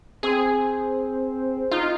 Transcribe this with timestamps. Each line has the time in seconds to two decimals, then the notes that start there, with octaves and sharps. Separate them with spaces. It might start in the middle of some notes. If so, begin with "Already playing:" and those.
0.23 C4 G#4
1.71 D#4 F4